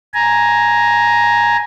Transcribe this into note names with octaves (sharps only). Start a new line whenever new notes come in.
G#5 A#5